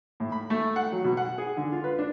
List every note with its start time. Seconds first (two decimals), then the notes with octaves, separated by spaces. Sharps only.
0.20 A2
0.32 B5
0.50 A3
0.76 F#5
0.92 F#3
1.04 B2
1.17 F#5
1.38 G#4
1.57 D3
1.72 F4
1.84 B4
1.99 D4